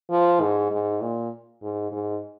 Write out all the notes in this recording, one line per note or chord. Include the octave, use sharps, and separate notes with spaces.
F3
G#2
G#2
A#2
G#2
G#2